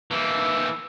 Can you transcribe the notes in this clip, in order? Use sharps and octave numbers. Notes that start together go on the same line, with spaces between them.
E3 A#3